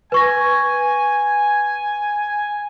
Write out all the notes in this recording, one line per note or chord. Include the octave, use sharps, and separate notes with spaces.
B4 G#5 C#6 A#6